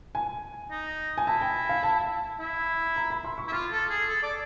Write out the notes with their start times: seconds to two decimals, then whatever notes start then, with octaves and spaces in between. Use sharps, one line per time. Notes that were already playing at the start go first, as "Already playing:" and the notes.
0.15 G#5
0.71 D#4
1.18 G#5
1.27 E4 A5
1.41 G5
1.69 F5
1.83 A5
2.40 E4
2.96 A#5
3.10 B5
3.24 C6
3.38 C#6
3.48 E4
3.52 F4 D6
3.71 A4
3.90 G#4
4.09 A4
4.23 D5